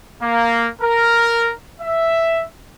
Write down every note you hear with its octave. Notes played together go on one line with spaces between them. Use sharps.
A#3
A#4
E5